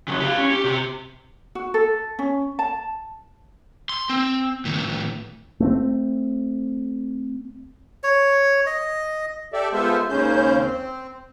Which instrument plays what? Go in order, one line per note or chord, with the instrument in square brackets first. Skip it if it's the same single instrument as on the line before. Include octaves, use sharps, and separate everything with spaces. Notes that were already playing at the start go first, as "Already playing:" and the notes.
[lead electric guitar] C#3 F#3
G4 F5
C#4
G4
C3 G4
[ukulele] F#4
A4
C#4
A5
[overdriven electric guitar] C6
C4
A2 D#3
[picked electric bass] A3 A#3 C4
[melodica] C#5
D#5
[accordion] G4 A4 D5 E5
G#3 B3 F4 A4 C5 E5
D#2 G#2 C#3 C#4 C5 G6
C4